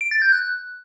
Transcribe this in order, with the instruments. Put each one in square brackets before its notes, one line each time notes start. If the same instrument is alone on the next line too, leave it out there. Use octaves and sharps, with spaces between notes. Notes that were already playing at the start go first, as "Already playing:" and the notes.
[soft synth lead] D7
A6
G6
F#6